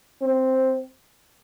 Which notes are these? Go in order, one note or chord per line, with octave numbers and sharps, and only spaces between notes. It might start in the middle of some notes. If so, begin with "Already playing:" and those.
C4